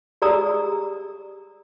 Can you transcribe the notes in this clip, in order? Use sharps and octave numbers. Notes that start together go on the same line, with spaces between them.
G4 G#4 D5 A#5 D#6 E6